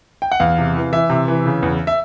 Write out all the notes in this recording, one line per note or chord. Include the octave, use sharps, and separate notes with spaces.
G5
F#5
E2 F5
C3
E3
E3 E5
C3
E3
C#3
E2
E5